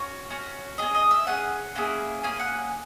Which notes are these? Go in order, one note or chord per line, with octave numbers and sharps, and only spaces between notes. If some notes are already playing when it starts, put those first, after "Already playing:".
Already playing: C#4 F#4 C#5
C#4 F#4
C#4 G#4 D#5
D#5
E5
C#4 G#4 F#5
A#3 C#4 E4 G#4
A#3 C#4 G#4 G#5
F#5